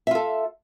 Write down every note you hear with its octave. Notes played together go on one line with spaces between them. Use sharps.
F4 A4 E5